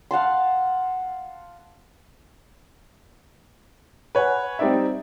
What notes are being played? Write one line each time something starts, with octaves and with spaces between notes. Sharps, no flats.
F5 F#5 A5 C6
B4 C#5 F#5 G#5
G3 C4 D#4 D5 E5